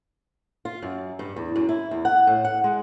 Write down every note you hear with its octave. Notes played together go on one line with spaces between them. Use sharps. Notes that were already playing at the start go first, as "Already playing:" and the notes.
F4
F#2
G2
E2
F#2
E4
E2
F#5
A2
F#5
G#3